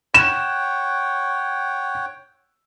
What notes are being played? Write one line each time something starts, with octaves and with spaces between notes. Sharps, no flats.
C#5 F#5 G5 E7